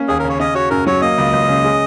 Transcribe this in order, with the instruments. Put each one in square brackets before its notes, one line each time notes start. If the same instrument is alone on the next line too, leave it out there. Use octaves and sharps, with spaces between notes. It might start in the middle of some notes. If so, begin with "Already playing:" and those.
Already playing: [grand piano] A#3 C#4
[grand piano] D#2 [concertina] G#4
[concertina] A#4
[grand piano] C#3 [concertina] C#5
[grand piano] C#4 [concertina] D#5
[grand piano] F#4 [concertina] C#5
[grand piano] F#2 [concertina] A#4
[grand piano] F#3 [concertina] C#5
[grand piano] A#3 [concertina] D#5
[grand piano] C#2
C#2
C#3
G#3